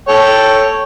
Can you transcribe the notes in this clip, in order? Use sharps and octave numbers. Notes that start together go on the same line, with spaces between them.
A4 C#5 G5